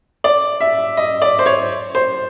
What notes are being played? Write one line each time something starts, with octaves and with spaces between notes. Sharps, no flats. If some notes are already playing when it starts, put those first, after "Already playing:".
D5
E5
D#5
D5
C5
C#5
C5